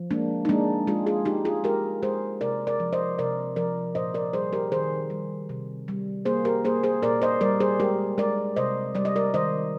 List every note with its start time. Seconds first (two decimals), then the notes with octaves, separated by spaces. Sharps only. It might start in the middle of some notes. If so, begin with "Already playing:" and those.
Already playing: F3
0.11 G#3 A#3 D4
0.45 D#4
0.49 G#3 A#3 D4
0.87 G#3 F4 G#4
1.06 F4 G#4
1.25 G#3 D#4 G4
1.45 F4 G#4
1.64 G#3 G4 A#4
2.03 G#3 G#4 C5
2.41 C3 A#4 D5
2.67 A#4 D5
2.80 F3
2.93 C5 D#5
3.18 C3 A#4 D5
3.56 F3 A#4 D5
3.95 A#2 C5 D#5
4.14 A#4 D5
4.33 G3 G#4 C5
4.53 G4 A#4
4.72 D#3 G#4 C5
5.10 G3
5.49 C3
5.88 G3
6.25 A#3 G#4 C5
6.45 G4 A#4
6.65 A#3 G#4 C5
6.83 G#4 C5
7.02 A#2 A#4 D5
7.22 C5 D#5
7.41 G3 A#4 D5
7.60 G#4 C5
7.80 G#3 G4 A#4
8.18 G#3 A#4 D5
8.56 C3 C5 D#5
8.95 G3 D5
9.05 D#5
9.16 A#4 D5
9.34 D#3 C5 D#5